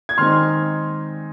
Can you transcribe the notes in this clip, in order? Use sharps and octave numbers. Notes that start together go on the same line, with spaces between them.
G#6
D#3 G#3 C4 D#4 C6 F6